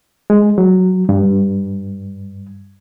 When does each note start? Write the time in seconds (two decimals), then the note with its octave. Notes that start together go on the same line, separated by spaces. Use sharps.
0.30 G#3
0.58 F#3
1.09 G2